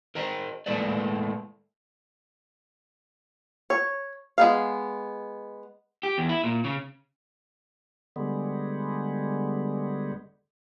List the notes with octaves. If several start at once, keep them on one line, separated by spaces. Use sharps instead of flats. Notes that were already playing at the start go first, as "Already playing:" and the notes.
A#4 C5 D#5 A#5
A2 G#3 A#3 A4 B4 D5
C#5
G#3 B3 F5
G4
E2
E4
A#2
C#3
D3 G3 G#3 B3